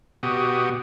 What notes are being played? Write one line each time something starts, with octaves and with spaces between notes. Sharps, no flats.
B2 F#4 G4 D#6